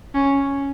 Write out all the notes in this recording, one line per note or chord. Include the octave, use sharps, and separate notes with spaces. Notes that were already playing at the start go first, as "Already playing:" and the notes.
C#4